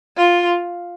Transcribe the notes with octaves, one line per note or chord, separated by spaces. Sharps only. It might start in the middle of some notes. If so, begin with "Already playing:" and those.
F4